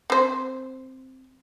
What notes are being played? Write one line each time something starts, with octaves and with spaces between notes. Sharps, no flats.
C4 C5